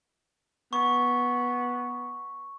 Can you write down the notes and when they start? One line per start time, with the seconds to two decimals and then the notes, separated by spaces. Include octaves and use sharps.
0.73 B3 C#6